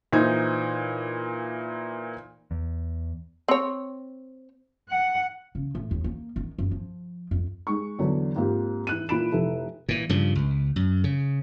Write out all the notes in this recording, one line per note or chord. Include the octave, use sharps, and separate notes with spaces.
A#2 E3 D#4 C5 G#6
E2
C4 C#5
F#5
C#3
A2
D#2
A#3
D#3
F#2
F3
F2
G#3 D#4 C#6
E2 D3 F#3
G#2 A#3 C4 F4 G4
E3 F#6 D#7
A#2 E3 B5 D7 E7
F1 E4 A4
A#2 E3
G2 C#3 F3
C#2
F#2
C#3